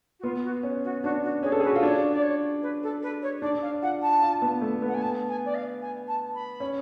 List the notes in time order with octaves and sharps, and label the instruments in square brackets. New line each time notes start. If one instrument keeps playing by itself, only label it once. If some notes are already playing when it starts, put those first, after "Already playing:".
[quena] F#4
[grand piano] B3 [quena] F4
[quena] F#4
[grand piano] C#4
[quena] F#4
[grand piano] D4 [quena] F#4
[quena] F#4
[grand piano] C#4 [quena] G#4
[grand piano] A4
G#4
[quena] B4
[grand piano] F#4
F4
[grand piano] D4 [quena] C#5
[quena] D5
C#5
B4
A4
B4
C#5
[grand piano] D4 [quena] D5
[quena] F5
[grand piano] F4 [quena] F#5
[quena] A5
[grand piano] F4
B3
A3
[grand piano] B3 [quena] F#5
[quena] G#5
A5
G#5
D5
F5
G#5
A5
B5
[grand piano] C#4